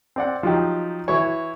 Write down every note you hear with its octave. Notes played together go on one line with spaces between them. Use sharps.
C4 D5 F#5
F3 F#3 D#4 G4
E3 E4 F#4 C#5